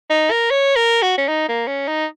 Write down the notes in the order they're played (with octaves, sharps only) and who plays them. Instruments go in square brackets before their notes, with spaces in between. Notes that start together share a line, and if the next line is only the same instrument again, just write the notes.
[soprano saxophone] D#4
A#4
C#5
A#4
F#4
C#4
D#4
A#3
C#4
D#4